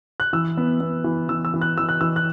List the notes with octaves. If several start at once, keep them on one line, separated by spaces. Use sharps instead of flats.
F#6
E3 E6
B3
B3
E3
E3 E6
E6
E3
F#6
E3 E6
F#6
E3 E6
F#6